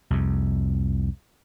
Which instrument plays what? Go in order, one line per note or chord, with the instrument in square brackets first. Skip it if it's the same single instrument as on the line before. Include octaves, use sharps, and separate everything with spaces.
[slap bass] C2 F2